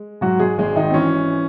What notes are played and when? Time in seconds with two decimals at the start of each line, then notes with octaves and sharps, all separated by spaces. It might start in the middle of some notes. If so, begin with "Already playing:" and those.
Already playing: G#3
0.21 G#2 F#3 F#4
0.39 G#3 G#4
0.58 G#1 G#3 G#4
0.76 D#3 D#4
0.90 C4
0.94 E3 C#4